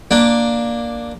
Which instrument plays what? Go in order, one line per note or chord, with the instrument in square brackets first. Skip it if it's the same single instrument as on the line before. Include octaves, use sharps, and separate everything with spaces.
[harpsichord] A#3 D4